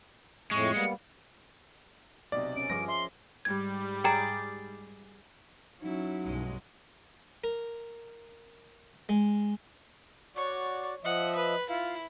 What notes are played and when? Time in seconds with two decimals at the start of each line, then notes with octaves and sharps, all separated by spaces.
0.51 F2 A2 G#3 C#6
0.74 G3 A#3 B3 C#7
2.32 B1 C3 D5 D#5
2.56 C#4 A#4 D7
2.70 G2 F3 G#4 D6 A#6
2.88 E5 C6
3.45 G#2 G3 G#6
4.04 G#4 D5 G5 A#5
5.81 F#3 C#4 D#4 E4
6.23 B1 G2 G#3
7.44 A#4
9.09 G#3
10.36 F#4 C#5 D5
11.04 F3 D#5 E5 F#5
11.36 B4
11.70 E4 F4 F5